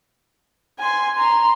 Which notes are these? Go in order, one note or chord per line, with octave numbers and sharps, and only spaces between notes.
G#5 C6
A#5 C6